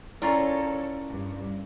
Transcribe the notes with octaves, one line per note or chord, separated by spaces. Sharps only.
C#4 E4 F4 A4 A#4 C#5 D5 A#5
G2